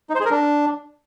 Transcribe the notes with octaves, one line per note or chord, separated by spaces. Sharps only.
D#4
C5
G#4
A#4
D4